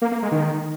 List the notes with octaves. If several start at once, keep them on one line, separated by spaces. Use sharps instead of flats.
A#3
A#3
G#3
D#3